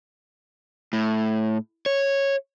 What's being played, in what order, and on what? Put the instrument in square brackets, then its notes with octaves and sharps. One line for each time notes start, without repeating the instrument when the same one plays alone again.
[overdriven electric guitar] A2
C#5